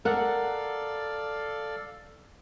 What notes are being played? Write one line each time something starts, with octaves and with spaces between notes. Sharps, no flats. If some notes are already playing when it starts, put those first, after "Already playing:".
A4 A#4 D5 F5 F#5